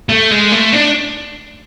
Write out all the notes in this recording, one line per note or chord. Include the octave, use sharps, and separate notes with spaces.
A3
G#3
A3
D4